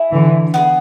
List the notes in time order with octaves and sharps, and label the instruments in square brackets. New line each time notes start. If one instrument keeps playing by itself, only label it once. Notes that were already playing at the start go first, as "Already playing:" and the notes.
Already playing: [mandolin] E4 G#4
[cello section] D3 E3
[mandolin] B3 E4 G#4